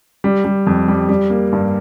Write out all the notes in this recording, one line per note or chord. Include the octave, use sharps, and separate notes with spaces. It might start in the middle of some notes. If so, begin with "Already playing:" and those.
G3
G3
F2
G3
G3
A#3
G2